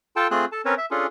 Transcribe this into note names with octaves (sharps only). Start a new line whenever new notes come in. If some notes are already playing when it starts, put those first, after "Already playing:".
F4 A4 G5 A5
A3 C4 F4 G#4 F#6
A4 A5
C4 C#4 A#4 B4 C#5
E5
C#4 D4 F4 G#4 A4